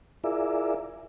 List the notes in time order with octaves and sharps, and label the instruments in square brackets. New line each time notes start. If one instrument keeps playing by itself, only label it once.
[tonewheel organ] E4 F4 G#4 A#4 D5 E5